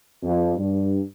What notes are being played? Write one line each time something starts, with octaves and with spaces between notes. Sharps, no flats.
F2
G2